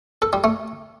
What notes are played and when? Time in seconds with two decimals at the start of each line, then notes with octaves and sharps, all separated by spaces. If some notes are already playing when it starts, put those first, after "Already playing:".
0.22 A4
0.33 G3
0.44 A3